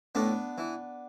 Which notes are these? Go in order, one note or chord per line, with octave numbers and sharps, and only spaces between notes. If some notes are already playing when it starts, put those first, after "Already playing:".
A2 B3 D4
E3